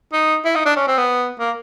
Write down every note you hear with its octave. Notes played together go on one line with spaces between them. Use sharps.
D#4
E4
D#4
D4
C#4
C4
B3
A#3